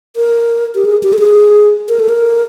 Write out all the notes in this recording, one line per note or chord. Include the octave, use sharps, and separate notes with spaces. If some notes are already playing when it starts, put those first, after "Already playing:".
A#4
G4
G#4
G4
A4
G#4
A#4
A4
A#4